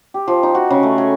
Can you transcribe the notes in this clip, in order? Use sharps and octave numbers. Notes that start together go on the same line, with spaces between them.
G4
F3
D#4
F#4
C#3
A3
G#5